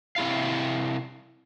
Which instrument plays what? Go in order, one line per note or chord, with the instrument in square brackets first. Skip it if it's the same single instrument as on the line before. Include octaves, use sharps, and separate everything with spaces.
[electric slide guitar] C3 G#3 E4 F5